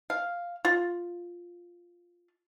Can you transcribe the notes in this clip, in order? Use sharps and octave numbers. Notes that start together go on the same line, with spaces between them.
F5
F4